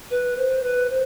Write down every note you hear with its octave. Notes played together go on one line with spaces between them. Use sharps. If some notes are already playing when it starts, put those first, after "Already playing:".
B4
C5
B4
C5